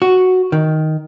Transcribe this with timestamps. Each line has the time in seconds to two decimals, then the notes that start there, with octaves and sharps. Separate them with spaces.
0.02 F#4
0.52 D#3